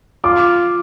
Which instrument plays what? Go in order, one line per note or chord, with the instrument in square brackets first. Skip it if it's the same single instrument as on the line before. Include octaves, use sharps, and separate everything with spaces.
[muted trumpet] F4 [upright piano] D6